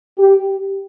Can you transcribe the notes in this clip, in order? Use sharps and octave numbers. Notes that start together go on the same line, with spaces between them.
G4